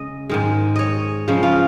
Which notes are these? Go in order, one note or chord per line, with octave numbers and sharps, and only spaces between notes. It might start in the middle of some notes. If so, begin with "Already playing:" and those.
Already playing: C#3 G#3 D#5
G#2 D#3 G#3
C#5 D#5
C#3 F3 G#3
F4